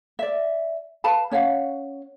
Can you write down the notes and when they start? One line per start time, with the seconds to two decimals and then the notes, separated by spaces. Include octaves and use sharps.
0.19 D5 E5
1.04 B4 F5 A5 B5
1.31 C#4 C#5 F5 F#5